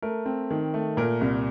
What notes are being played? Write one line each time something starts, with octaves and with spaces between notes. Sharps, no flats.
A3 A#4
C4
D#3
A3
A#2 A#4
C2